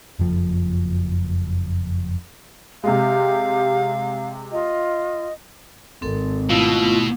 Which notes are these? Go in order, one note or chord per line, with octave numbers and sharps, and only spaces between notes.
F#1 F2 F3
C3 G#3 G4 F5
F4 D#5
G#1 C4 A4
B2 A3 B3 E4 F4